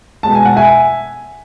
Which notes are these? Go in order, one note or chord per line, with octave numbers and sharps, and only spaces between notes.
B2 G#3 A5
G#5
F#5
E5 G#5